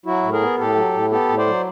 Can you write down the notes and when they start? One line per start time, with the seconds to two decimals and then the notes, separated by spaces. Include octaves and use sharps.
0.06 F#3 E4 F#4
0.23 A2
0.32 G#4 A#4
0.41 B3
0.59 A2 G4 A4
0.76 F#3
0.94 A2
1.11 B3 G4 A4
1.29 A2
1.38 C5 D5
1.47 F#3